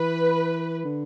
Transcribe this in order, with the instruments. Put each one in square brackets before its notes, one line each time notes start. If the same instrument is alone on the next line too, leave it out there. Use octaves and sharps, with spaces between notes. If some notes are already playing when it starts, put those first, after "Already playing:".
Already playing: [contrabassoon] E3 [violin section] B4
[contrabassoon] D3